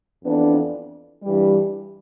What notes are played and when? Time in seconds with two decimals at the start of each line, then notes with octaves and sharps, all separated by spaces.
0.24 F2 E3 B3 D4
1.22 G2 E3 G3